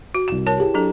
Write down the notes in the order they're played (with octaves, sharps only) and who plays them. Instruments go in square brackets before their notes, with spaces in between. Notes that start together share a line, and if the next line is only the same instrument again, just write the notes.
[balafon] F#4
[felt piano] C2 E7
[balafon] A#4 C#5 A5
[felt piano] E4 G4 G#4
[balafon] F#3 D4 A4